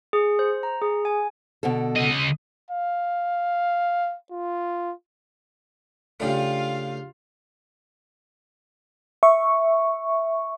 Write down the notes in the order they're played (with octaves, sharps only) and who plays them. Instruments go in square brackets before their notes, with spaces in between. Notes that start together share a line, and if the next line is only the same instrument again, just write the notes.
[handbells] G#4
C5
A#5
G#4
G#5
[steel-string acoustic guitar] B2 D3 A4
[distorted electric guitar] C#3 D#5
[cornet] F5
F4
[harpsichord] C#3 A3 [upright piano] D4 G4 [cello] F4 F5
[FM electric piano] E5 C#6